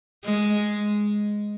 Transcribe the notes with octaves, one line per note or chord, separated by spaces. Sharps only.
G#3